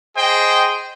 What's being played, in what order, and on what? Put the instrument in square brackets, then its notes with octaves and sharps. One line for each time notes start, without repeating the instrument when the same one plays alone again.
[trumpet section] G#4 C5 D#5 G5